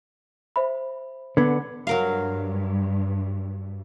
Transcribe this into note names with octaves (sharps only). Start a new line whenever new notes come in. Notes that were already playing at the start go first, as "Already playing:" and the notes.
C5 E5 B5
D3 B3 G#6
G2 F#3 A#4 F5